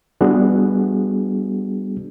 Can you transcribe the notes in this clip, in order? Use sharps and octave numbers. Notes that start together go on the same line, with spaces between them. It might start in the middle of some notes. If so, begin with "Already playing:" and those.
G3 B3 D4 F#4 G#4